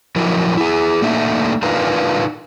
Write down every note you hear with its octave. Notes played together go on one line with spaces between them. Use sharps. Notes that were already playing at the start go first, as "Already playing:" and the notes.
F3 F#3 E4 A#4
E4 G#4
A3 A#3 D4 D#4 E5
D4 D#4 F4 A#4 B4